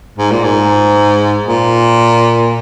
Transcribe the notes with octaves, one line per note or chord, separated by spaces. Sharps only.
G#2
A#2
G#2
A#2